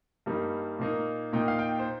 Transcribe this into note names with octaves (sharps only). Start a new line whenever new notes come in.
G2 G3 A#3 D#4
A#2 A#3 D#4
A#2 A#3 D#4 G5
F5
G5
C5